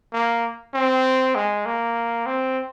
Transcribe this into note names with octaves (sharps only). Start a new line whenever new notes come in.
A#3
C4
G#3
A#3
C4